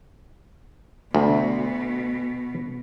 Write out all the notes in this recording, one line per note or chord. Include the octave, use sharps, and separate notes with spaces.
D2 B2